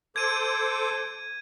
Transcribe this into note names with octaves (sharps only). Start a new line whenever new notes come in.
A4 C5 D6 G#6 D#7